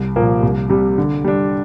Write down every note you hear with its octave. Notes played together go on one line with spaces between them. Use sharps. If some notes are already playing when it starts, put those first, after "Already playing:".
Already playing: C2
A#2 F3 A#3
C2
C3 G3
D3
G3 D4